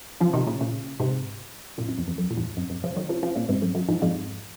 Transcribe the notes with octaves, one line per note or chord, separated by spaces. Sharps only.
C#3 F3
C3 D#3
A#2 C#3
A#2 C#3
G#2 C3
F#2 A#2
F#2
F2
F2
F#2
A#2
F2 G#2
F#2
F#2
C#3 F3
D#3 F#3
C#3 F3
C#3 F3
A#2 C#3
G#2 C3
F#2
F#2
F2 G#2
F2 G#2